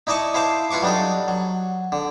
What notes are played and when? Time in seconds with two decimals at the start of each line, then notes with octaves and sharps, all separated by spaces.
0.07 D#4 E4 D5 D#5 A5 C#6
0.34 E4 C5 F5 A5 D6
0.71 E4 F4 B4 C#6 D6
0.82 F#3 G3 D4 D#4 A4
1.28 F#3
1.92 D3